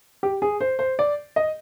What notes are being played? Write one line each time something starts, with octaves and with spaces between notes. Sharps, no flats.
G4
G#4
C5
C5
D5
D#5